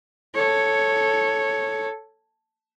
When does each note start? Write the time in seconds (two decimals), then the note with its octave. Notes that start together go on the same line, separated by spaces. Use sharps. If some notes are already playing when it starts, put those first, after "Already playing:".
0.35 A4 C#5